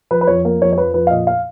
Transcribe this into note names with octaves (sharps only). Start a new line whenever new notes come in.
F3 B4
B4
F2 C#5
A#3
F2 C#5
C#5
F3 B4
F2 B4
F5
A#2 D#5
F5